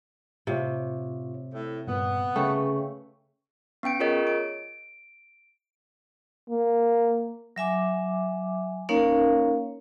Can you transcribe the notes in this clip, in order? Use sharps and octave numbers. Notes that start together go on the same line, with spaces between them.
A2 C3 F4 C#5
A2
G2 A#2 B3
C#3 A3 B4 G5 C#6
B3 C#4 G5 D7
F4 G#4 A#4 C#5 D#5
D7
A#3
F#3 E5 G#5 D6
A#3 C#4 D#4 A#4 C#5 F5